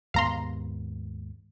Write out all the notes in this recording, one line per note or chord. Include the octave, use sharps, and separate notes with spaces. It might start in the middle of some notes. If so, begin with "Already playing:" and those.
D#2 G#2 B3 F5 A#5 C6